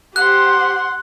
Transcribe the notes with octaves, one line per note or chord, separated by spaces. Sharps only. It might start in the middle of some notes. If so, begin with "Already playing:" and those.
G4 C5 F#5 C6 F#6